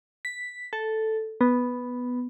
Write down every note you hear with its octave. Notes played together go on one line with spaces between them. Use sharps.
B6
A4
B3